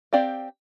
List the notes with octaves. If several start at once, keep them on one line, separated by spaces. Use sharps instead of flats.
C4 G4 D5 F5